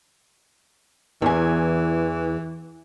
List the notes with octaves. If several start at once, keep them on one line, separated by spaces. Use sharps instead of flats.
E2 E3 G#5